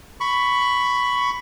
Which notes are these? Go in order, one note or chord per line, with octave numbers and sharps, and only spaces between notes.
B5 C#6